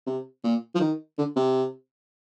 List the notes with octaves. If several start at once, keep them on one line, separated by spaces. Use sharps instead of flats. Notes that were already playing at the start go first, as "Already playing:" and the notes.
C3
A#2
F3
D#3
D3
C3